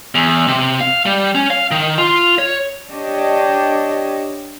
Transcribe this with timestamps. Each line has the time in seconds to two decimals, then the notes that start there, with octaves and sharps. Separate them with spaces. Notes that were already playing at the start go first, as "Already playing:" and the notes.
0.15 E2
0.48 C3
0.81 F5
1.06 G3
1.35 C#4
1.50 F5
1.71 D#3
1.98 F4
2.39 C#5
2.89 D4 G4 C#5 D#5